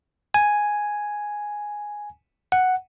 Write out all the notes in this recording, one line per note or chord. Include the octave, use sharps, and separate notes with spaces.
G#5
F#5